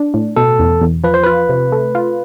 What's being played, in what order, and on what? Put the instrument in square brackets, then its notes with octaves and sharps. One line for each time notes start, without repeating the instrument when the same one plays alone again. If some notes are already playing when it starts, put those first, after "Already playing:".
Already playing: [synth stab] D4
A2
[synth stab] B2 [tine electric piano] A4
[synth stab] E2
E2
[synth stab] F3 [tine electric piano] B4
[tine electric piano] C5
[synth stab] F4 [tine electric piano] B4
[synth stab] C3
A3
F4